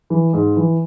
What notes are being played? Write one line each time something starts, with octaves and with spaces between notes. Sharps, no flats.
E3
G#2
E3